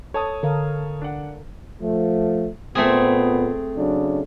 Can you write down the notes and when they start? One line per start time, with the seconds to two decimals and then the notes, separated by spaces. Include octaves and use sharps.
0.14 A4 C#5 A5 D#6
0.43 D3 A4 A#4 F5
1.02 D4 F#5
1.80 F3 A3
2.75 A#2 A3 B3 C4 G#4
3.76 C#3 F#3 D4